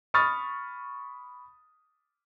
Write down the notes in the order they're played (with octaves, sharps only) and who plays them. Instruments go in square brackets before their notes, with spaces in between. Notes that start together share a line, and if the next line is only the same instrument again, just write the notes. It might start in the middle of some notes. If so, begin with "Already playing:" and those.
[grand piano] B5 C#6 D#6 F6 A6